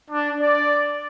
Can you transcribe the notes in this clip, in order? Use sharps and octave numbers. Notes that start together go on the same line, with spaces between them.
D4
D5